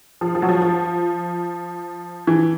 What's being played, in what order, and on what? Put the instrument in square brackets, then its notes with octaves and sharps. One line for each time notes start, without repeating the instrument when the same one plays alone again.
[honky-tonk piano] F3
F3
F#3
F3
F3
E3